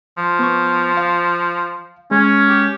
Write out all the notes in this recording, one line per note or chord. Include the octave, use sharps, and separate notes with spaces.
F3
B3 C#6
F5
G#3 C#4
G4